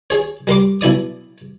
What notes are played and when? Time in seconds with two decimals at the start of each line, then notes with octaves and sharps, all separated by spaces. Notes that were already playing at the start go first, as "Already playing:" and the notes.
0.10 G#4 C#5
0.47 G3 A#4 C6 D6
0.81 B1 E4 D5 D#6